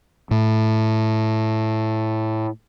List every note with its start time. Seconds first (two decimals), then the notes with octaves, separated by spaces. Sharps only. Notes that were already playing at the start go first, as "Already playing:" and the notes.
0.31 A2 A3